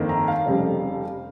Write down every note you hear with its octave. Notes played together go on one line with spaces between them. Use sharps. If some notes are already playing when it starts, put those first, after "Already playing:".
Already playing: G1 F2 D#3 A#3
A#5
F5
F1 F2 C#3 G3